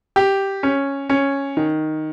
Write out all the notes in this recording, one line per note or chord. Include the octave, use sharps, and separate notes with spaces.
G4
C#4
C#4
D#3